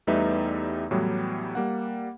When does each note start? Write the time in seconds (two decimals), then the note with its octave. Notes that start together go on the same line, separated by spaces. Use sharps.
0.07 E2 G3 A3 D#4 B4 E5
0.91 A2 E3 F#3 G3 B3
1.55 G3 A#3 F#5